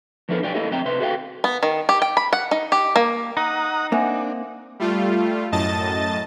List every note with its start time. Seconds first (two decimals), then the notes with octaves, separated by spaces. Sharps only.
0.29 F3 B3 D4 E4 A4 A#4
0.42 B1 D4 G4 D5 G5 G#5
0.54 A#3 E4 A4 A#4 D#5
0.70 F2 D3 C4 E5 G5 A#5
0.85 C3 B4 E5 C6
1.00 F#4 G#4 A4 E5 F5 G5
1.44 B3
1.63 D#3
1.89 G4
2.02 G5
2.17 B5
2.33 F#5
2.51 D#4
2.72 G4
2.96 A#3
3.37 D#4 F#5 A#5 D#6
3.92 A#3 C4 D4 E5 F#5 G#5
4.79 G3 A3 F4
5.52 F#2 A2 D#5 A5 A6